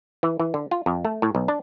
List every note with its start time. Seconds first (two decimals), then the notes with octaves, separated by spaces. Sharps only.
0.23 E3
0.39 E3
0.54 D3
0.71 F4
0.86 F2
1.05 A3
1.22 A2
1.35 B1
1.48 D4